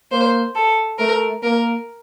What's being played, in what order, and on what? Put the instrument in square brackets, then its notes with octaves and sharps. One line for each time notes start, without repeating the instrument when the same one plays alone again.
[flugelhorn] A#3 [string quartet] C5
[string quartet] A4
[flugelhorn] A3 [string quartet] A#4
[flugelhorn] A#3 [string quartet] A#4